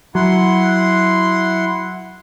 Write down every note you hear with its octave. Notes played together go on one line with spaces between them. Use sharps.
F#3 E4 F#5 C6